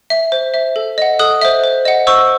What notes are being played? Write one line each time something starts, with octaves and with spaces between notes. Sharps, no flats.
E5
C5
E5
A4
D#5 F#5
A4 D#6 F#6
C5 E5
C5
D#5 F#5
C5 C#6 E6